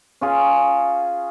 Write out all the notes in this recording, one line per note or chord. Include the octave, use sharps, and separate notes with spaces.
C#4 F4 G#4